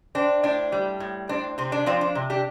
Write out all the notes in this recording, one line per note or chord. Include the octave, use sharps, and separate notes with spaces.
C4 D4
A2 D4
G3
A2
C4 D4
C3 C4
D4
F3 C4 F4
D4
C3
D4 G4